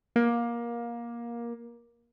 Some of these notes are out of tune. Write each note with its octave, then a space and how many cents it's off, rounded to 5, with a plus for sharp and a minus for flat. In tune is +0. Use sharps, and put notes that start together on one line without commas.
A#3 +20